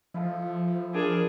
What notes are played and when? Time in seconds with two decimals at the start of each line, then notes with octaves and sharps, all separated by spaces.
0.14 F3 E4 F4 A4
0.94 D4 G#4 A#4